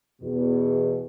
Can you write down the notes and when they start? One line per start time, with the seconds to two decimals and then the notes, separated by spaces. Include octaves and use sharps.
0.22 E2 B2